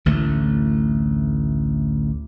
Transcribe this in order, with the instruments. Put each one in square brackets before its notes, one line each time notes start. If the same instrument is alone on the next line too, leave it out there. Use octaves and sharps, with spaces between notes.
[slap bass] A1 D2 E3 A3